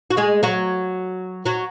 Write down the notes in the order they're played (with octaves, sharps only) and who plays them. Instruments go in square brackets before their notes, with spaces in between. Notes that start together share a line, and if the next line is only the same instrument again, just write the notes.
[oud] F#4
G#3 G#4
F#3 F#4
F#3 F#4